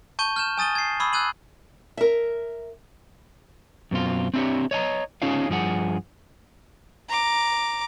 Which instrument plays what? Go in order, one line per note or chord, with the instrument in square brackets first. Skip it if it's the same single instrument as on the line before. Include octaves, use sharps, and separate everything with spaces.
[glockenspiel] A5 C#6 G6 D#7 G7
F6 G6 E7
G#5 D#6 A6 D#7 G7
G#6 C7
B5 C#6 D#6 E6 G#6
E6 F#6 G#6 D#7 F#7
[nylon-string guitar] A#4 E5
[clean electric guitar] F#2 B2 C4 F4
C4 D4 E4 F4 G4 C#5
C#5 D#5 G#5 A#5
C#4 D#4 F4 G#4 C#5 F5
G2 F3 G#4 F#5
[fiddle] A#5 D6